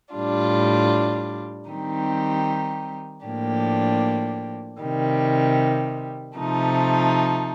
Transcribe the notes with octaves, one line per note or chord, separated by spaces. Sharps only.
A2 G3 D4 F4
D#3 G3 C4 D#4 G4
A2 F3 A#3 D4 G4
C3 D#3 G3
C3 F3 A3 D#4